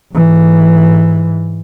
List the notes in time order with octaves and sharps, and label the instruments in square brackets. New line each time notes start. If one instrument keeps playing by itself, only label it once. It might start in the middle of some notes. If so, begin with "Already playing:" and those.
[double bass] G#2 E3